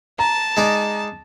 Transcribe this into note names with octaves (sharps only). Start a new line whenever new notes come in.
A5 A#5
G#3 D#4 D5